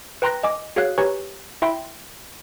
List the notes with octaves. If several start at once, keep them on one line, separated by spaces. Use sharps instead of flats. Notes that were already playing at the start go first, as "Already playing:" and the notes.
B4 G5 A#5 C6 F#6 A#6
D#5 G#5 D6
F#4 G#4 C#5 F5 F#6
G4 B4 C#5 G#5 A#5 C#6
E4 E5 G5 B5 C6